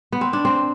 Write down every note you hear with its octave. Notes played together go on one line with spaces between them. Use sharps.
B3
C4
D4
C4